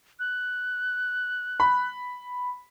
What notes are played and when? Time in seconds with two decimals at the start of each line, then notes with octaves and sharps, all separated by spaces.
0.19 F#6
1.60 B5